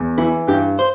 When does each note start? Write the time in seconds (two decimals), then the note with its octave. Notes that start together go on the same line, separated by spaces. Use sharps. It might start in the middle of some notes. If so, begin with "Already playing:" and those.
Already playing: E2
0.18 E3 E4
0.48 G2 G4
0.79 C5